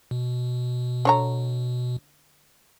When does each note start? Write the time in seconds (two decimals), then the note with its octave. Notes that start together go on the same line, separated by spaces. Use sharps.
0.11 B2
1.05 D3 C#5 A#5